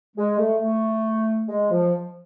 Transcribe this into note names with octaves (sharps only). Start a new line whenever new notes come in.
G#3
A3
A3
G#3
F3